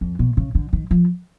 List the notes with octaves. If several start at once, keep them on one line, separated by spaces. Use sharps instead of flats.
F2
B2
C#3
D3
D#3
F3